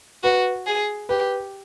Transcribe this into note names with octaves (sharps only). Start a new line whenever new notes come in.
F#4 B4
G#4
G4 B4